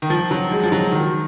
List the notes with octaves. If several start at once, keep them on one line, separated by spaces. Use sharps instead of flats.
D#3
F3
F#3
G#3
F3
F#3
D#3